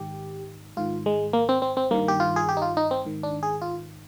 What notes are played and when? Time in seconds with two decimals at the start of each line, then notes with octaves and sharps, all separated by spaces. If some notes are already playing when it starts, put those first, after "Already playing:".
Already playing: G#2 D#3 G4
0.77 G#2 D#3 F4
1.06 G#3
1.33 A#3
1.49 C4
1.62 C4
1.77 C4
1.91 G2 D#3 A#3
2.08 G4
2.20 F4
2.36 G#4
2.49 G4
2.57 D#4
2.62 F4
2.77 D#4
2.91 C4
3.05 G#2 D#3
3.23 D4
3.43 G#4
3.62 F4